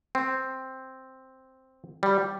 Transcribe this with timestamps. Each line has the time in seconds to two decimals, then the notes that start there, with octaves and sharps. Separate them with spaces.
0.15 C4
2.03 G3